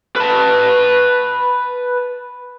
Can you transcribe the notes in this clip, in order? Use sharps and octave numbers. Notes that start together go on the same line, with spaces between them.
B4 A5